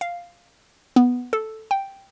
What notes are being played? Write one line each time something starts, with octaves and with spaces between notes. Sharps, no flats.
F5
B3
A4
G5